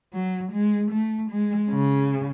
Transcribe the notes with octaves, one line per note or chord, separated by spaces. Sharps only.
F#3
G#3
A3
G#3
C#3